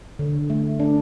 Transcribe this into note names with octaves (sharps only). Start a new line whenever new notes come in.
D3
A3
D4